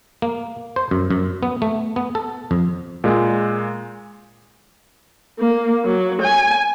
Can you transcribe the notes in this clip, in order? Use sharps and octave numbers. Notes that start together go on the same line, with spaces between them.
A#3
C5
F#2
F#2
B3
A3
B3
A4
F2
A#2 G#3
A#3
F#3
G#5